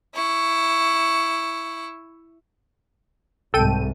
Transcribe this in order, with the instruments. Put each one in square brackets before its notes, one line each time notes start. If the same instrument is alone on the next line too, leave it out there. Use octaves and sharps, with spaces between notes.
[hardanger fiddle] E4 C#6
[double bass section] C2 G#2 [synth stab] A4 G5 D#7